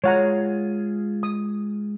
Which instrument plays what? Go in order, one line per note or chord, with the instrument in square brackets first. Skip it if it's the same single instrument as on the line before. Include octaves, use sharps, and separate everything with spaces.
[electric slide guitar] G#3 F4 G#4 [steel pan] C#5 F#5 A#5
[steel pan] D#6